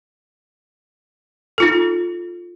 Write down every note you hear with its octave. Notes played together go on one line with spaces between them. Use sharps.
D#4 F4 A4